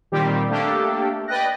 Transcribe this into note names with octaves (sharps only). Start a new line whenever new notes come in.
A#2 D#3 G3 C4 G4
A3 A#3 D4 G4 A4
B4 D5 D#5 G5 F#6 A#6